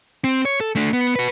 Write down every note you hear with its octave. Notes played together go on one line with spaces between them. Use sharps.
C4
C#5
A4
A3 D4
B3
F#4 B4